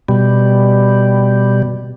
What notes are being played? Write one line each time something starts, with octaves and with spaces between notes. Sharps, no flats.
B2 G3